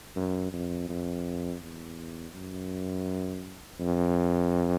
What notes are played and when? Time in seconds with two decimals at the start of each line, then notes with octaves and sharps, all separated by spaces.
0.16 F#2
0.53 F2
0.89 F2
1.62 E2
2.34 F#2
3.80 F2